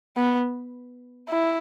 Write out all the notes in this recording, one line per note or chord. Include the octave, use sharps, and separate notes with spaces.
B3
E4